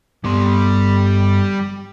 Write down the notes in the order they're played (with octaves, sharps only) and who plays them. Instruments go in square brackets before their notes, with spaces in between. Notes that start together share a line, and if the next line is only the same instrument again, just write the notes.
[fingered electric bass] G2 B3 [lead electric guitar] G3 C6